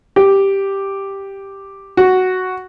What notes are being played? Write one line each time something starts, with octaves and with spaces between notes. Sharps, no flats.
G4
F#4